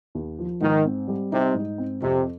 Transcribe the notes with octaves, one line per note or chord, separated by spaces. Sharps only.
D#2
F3
G#2 D#3
C4
G3
C3 D#4
G#2
C4
F2 C3